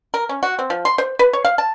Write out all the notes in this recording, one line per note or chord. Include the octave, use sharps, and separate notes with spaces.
A#4
C#4
F#4
C4
F3
C6
C5
B4
C#5
F5
A5